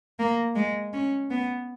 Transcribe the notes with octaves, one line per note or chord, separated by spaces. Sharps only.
A#3
G#3
C#4
B3